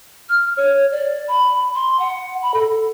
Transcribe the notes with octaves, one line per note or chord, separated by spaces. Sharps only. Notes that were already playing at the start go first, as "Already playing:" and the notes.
F6
C#5
D5
B5
C6
F#5
B5
A4